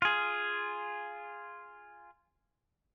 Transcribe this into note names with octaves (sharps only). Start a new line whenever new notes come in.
F4 G#4